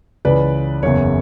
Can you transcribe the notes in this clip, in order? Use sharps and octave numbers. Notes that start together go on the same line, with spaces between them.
C#2 C#3 E3 B4 D5
F#1 E2 C#3 C#5